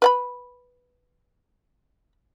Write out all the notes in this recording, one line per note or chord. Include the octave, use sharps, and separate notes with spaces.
B4 F#5 B5